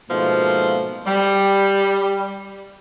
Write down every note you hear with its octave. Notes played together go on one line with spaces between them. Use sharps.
G#2 B2 F3 A3 A#3
G3